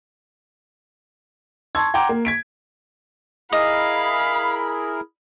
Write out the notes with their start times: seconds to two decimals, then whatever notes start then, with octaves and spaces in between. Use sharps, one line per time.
1.75 A5 C6 C#6 E6 G#6
1.94 F#5 G5 A#5 C6 D6 G#6
2.09 A#3
2.25 G#6 B6 D7
3.52 E4 G#4 A#4 D#5 F5 B5